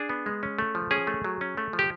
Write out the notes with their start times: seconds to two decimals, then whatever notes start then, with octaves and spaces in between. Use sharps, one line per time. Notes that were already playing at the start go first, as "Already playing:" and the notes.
Already playing: D4 G#4
0.09 B3
0.26 G#3
0.43 C#4
0.59 A3
0.75 F3
0.91 C#4 G#4
1.07 A3
1.24 F#3
1.41 C#4
1.57 A3
1.73 F3
1.79 G4